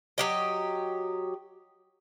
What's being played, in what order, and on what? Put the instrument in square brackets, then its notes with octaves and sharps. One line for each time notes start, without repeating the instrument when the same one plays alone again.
[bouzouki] F#3 G4 D#5